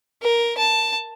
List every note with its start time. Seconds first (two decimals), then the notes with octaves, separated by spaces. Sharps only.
0.23 A#4
0.58 A5